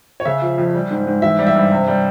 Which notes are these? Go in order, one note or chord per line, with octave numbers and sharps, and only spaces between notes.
C#5
C#3 E5
F3
F2
G3
G#2
G#2
E3 E5
G3
E5
G2
C3
G3